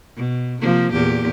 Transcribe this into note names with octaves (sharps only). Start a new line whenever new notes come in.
B2
C3 F3 A#3
E2 A#2 G4